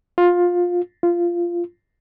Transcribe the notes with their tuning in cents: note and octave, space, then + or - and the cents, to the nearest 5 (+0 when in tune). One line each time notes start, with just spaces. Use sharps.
F4 +15
F4 -15